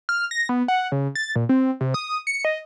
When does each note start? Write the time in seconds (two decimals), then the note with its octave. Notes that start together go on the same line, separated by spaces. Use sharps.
0.09 F6
0.31 A#6
0.49 B3
0.68 F#5
0.92 C#3
1.15 A6
1.36 A#2
1.49 C4
1.81 C3
1.94 D#6
2.27 C#7
2.45 D#5